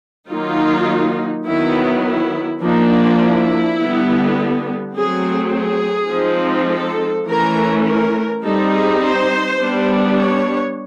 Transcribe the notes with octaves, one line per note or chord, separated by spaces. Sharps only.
D#3 F#3 A#3 D#4 F4
D#3 F#3 B3 E4
E4
F3 A#3 D4 D#4
E4
D3 G3 B3
F#3 A3 C4 G#4
G#4
F3 G#3 C4 D#4
A4
E3 A3 C#4 A#4
A#4
G3 C4 D#4 A4
G#4
C5
G3 B3 D4
C#5